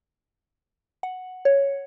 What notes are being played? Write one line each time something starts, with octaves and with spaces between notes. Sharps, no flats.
F#5
C#5